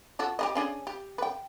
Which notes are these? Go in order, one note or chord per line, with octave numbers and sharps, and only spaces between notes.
F4 F#4 A4
G4 G#4 D#5
C#4 D4 G#4
G4
B4 G5